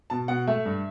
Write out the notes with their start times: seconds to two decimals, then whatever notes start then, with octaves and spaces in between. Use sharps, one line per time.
0.10 B2 A5
0.28 B2 F#5
0.47 A3 E5
0.65 G2